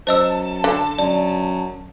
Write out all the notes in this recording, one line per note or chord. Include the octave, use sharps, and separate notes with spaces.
F#2 C5 D#5 A5 E6
D3
F#2 D5